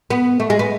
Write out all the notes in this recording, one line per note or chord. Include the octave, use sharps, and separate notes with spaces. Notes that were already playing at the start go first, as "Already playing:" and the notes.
B3
A3
G#3
B3